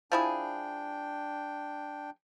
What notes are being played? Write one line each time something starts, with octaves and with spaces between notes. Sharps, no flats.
F3 D4 E4 G#4 G5